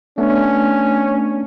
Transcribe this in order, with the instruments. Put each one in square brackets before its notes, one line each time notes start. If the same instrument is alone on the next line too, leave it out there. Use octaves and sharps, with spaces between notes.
[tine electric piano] A3 B3 D4 [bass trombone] C#4